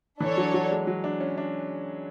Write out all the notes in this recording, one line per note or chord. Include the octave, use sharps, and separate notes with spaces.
E3 D4 A4 C#5
F#3
F#3
G#3
F#3
D4
C#4
D4